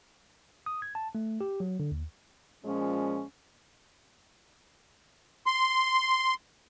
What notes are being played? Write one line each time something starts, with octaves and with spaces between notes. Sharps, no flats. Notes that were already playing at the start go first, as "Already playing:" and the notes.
D#6
G#6
A5
A3
G4
F#3
D3
D#2
A#2 F3 G#3 C#4
C6